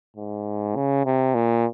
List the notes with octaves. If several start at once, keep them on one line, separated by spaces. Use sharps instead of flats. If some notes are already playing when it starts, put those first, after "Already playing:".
G#2
C#3
C3
A#2